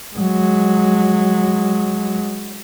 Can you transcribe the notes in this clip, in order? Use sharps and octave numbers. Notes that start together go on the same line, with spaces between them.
F#3 G#3